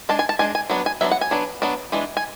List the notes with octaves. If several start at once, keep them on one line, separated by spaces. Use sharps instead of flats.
G#3 D4 A5
G#5
A5
G#3 D4 G#5
G#5
F#3 B3 D4
G#5
F#3 B3 D4 E5
F#5
G#5
F#3 B3 D4
F#3 B3 D4
E3 G#3 D4
G#5